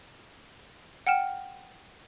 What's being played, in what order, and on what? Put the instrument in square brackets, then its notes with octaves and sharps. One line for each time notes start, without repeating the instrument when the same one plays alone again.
[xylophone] F#5 G5 F6 E7